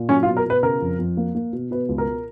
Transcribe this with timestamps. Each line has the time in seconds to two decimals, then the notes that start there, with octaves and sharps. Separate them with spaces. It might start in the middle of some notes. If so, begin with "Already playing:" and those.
Already playing: A#2
0.09 F#3 C#4
0.23 F4
0.26 B2
0.37 A#4
0.46 B2 B4
0.63 C#3 A#4
0.81 F2
0.99 F2
1.17 A#3
1.35 A#3
1.53 B2
1.71 B2 B4
1.89 C#2
1.98 A#4